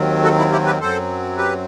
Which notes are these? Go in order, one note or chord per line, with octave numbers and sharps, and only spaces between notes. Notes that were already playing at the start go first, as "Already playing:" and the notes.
Already playing: D#2 D#3 F#3 C4
F#4 A4
E4
E4 G4
G4 B4
F#2 F#3 C4 A4 C5
G4 B4